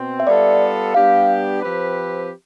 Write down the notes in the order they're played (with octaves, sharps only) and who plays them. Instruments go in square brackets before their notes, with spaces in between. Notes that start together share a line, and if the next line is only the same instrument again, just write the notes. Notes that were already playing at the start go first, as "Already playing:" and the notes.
Already playing: [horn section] B2 C4
[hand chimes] E5
[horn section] G3 B3 F4 A4 [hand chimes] D5
[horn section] G3 B3 D4 G4 [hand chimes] F5
[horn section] F3 C4 G4 B4